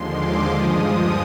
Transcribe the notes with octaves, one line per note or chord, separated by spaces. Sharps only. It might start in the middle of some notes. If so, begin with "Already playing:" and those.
Already playing: D#2 D3 F3 G#3 C6
D6
G2 F3 G#3 D#6
D#6